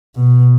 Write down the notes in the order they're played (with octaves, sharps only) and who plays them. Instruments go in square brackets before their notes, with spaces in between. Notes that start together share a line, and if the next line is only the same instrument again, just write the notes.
[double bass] B2